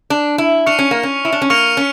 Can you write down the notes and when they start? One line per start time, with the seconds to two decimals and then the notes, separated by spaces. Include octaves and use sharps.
0.10 D4
0.38 E4
0.66 D4 C#6 F6 C#7 F7
0.79 C#4
0.91 A#3
1.03 C#4
1.25 E4
1.32 D4
1.42 C#4
1.50 A#3 C#6 F6 C#7 F7
1.77 C#4